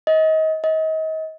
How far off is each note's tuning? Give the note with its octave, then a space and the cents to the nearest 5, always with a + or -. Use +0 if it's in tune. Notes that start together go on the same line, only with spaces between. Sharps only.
D#5 +30
D#5 +35